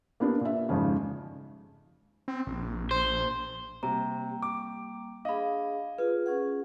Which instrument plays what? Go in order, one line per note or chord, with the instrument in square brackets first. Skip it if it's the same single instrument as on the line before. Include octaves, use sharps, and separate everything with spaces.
[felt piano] A#3 B3 D4 G4
A#2 E5
G#1 F2 C#3
[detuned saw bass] C4
A#1
[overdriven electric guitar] C5
[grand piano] C3 [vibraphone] G3 A#3 [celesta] A#5
[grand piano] D6
[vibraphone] D4 G#4 [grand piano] D#5 [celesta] F5 B5
[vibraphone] F4 G#4 [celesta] B4
[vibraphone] C#4 G#4 F#5